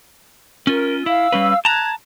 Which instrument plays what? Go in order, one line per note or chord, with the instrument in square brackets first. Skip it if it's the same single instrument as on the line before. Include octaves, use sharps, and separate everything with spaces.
[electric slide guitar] C#4 F4 [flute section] A#4
[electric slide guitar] E4 [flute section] F5 E6
[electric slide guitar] G3 C#4 B4
[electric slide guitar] A5 A#5 [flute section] F#6 G#6